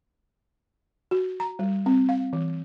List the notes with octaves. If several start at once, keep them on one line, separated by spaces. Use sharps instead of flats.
F#4
A#5
G3
C4
F5
E3